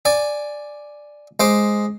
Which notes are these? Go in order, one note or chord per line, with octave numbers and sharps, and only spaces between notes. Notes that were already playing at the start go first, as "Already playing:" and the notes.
D5 G#5
G#3 C5 D6